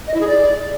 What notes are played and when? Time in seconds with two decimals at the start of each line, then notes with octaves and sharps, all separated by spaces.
0.07 D#5
0.14 E4
0.21 G#4
0.27 D5